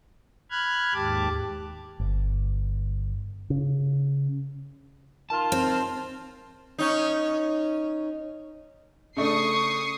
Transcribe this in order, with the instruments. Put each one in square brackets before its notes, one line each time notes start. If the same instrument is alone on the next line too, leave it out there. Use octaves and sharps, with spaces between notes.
[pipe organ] B5 F6 F#6 G#6
D#2 G#2 G4 A5 D6
[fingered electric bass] G1
C#3
[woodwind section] D#3 F4 [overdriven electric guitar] A5
[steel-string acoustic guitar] C4
[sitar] C#4 D#4
[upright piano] C#3 A3 D4 [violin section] C#6 D#6 C7